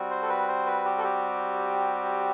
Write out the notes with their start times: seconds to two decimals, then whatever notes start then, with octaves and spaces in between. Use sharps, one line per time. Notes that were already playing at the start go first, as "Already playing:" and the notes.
Already playing: G3 C4 F#4
0.10 C5
0.23 A4
0.29 B4
0.48 C5
0.66 B4
0.85 G4
0.98 A4
1.04 G4